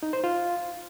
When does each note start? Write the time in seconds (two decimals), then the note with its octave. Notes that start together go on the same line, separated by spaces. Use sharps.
0.03 D#4
0.13 C5
0.24 F4